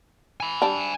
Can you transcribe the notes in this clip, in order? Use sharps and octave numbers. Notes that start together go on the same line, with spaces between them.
G#5 B5
G3 D4